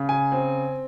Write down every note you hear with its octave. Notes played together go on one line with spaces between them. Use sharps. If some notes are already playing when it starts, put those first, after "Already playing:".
Already playing: C#3
G#5
C4